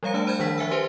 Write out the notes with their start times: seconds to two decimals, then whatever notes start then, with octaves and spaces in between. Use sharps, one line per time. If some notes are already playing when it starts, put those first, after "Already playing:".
0.03 F3 G3 C#5 F5 A#5 C#7
0.14 A3 D4 A5 E6
0.27 C5 B5 F6 G6 G#6
0.39 D#3 F3 D4 B6
0.58 F3 E5 G#5 E6
0.71 G4 B4 C5 G#5 C6